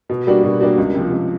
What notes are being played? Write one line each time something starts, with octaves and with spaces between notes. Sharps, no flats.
B2
G3 A#3 D4 F#4
B2
G3 A#3 D4 F#4
C#2
C3 F3
C#2